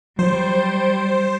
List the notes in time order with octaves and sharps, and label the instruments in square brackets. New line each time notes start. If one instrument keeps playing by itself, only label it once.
[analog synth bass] F#3 [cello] G3 [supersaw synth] C5